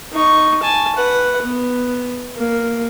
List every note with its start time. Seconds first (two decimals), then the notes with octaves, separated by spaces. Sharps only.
0.13 D#4 C#6
0.63 G#5 A5
0.96 B4 F#5
1.42 B3
2.37 A#3